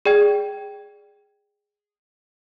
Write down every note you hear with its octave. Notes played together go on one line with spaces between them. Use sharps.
G#4 D5 G5 G#6